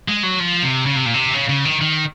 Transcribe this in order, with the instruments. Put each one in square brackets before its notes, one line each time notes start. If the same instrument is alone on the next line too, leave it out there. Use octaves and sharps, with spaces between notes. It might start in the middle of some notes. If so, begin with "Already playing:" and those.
[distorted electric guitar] G#3
F#3
F3
C3
C#3
C3
A#2
C3
C#3
C#3
D#3
D#3